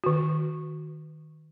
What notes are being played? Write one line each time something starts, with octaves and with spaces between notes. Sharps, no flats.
D#3 F#4